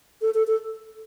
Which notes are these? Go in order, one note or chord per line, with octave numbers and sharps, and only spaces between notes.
A4
A4
A4